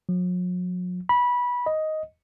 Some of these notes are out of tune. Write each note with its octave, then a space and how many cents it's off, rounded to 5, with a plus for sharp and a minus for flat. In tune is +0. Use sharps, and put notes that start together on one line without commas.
F#3 -45
B5 -20
D#5 +5